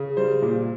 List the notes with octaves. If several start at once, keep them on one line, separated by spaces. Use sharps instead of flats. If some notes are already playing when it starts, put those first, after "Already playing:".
Already playing: C#3
G3 C5
A#2